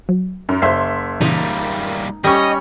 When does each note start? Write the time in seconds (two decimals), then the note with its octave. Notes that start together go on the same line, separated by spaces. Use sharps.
0.09 F#3
0.49 F#2
0.62 F#1 C5 E5 F5 C6
1.21 A#2 C#3 E3 G3 A#3 D#4
2.24 G3 C#4 G4 D#5 C#6